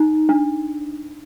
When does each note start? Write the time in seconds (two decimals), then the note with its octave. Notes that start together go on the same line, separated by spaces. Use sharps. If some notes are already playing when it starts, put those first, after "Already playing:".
Already playing: D#4
0.29 D4